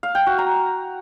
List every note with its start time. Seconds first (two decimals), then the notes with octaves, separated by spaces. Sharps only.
0.03 F5
0.15 G5
0.27 F#4
0.38 A#5